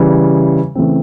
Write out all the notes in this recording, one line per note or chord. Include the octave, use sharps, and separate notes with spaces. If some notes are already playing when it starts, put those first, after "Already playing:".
Already playing: C#3 E3 G3
C#3 E3 A3 C4